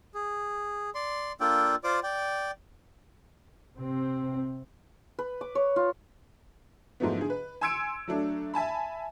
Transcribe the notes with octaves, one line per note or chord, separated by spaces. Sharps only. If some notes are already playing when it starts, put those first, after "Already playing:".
G#4
D5 C6
A#3 D4 F4 A4 D5 G5
F4 C5 D5 D6
D5 G5
C3 C4
B4
D6
C#5
F4
G#2 F3 F#3 A3 B3
D3 G#4
B4
G#5 C6 E6 G#6 C#7 D7
F#3 A3 D4
E5 G#5 A5 B5